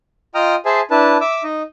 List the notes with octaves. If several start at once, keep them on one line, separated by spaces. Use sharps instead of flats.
F4 D#5 G5 A#5 D#6 F6
G#4 C5 E5 G#5 A5
D4 E4 B4 A5
E5 D6 E6
D#4 D#5